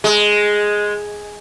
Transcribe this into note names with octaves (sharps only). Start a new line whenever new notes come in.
G#3